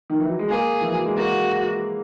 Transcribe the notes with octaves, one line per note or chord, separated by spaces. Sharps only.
D#3
E3
F#3
G#3
A#3 G#4
E3
F#3
G#3
A#3 F#4